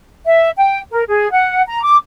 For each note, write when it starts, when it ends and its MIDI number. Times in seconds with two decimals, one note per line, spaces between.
0.25 0.49 76
0.57 0.80 79
0.91 1.02 70
1.08 1.31 68
1.32 1.62 78
1.66 1.82 82
1.83 1.96 86